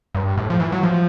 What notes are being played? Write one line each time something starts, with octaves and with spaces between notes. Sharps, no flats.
G2
A2
F3
E3
F#3
F3